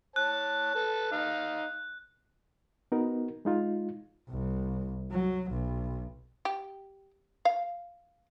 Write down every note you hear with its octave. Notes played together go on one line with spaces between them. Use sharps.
C#5 A5 F#6
A4 B4
D#4 F5
B3 D#4 F#4 A#4
G#3 D#4 F4
C2
F#3
B1
G4
F5